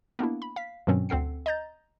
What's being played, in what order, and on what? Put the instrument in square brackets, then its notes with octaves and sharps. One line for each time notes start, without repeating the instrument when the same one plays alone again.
[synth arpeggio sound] A#3 B3 D4 E4
B5
F5 B6
G2 B2 D#3 F#3 C4 C#4
D2 C4 A4 F#5 C7
D#5 A#5 G6 A6